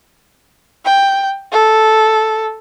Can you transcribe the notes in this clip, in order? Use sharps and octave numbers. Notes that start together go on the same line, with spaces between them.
G5
A4